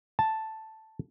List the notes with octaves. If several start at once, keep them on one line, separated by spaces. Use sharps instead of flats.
A5